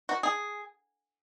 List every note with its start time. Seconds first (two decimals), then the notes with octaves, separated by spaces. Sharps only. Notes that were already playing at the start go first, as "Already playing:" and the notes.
0.09 F#4
0.23 G#4